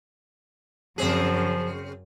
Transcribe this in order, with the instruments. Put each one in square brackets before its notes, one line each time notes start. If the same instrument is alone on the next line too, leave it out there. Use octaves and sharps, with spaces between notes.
[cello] F#2 [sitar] C#3 C4 G#4 [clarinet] F3